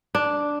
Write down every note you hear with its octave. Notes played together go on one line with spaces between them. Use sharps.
D4